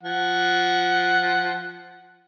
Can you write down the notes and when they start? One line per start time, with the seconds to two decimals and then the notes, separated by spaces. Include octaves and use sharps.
0.03 F3 F#5